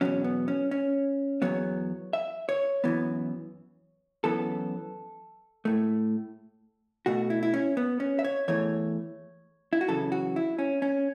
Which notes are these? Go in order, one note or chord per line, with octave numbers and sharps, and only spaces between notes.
E2 B2 F#3 C#4
B3
C#4
C#4
E2 C#3 F#3 B3 C#5
E5
C#5
F#2 E3 B3
F#2 E3 B3 A4
A2 A3
B2 A3 F#4
E4
E4
C#4
B3
C#4
E5
C#5
E2 E3 A3 C#5
E4
F#4
F#2 C#3 E3 A4
F#4
E4
C#4
C#4